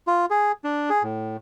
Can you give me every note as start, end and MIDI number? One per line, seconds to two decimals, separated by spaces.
0.07 0.26 65
0.30 0.52 68
0.64 0.90 62
0.90 1.03 68
1.03 1.37 45